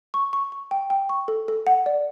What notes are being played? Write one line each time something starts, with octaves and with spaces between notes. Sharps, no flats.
C#6
C#6
C#6
G5
G5
C#6
A4
A4
F#5
D5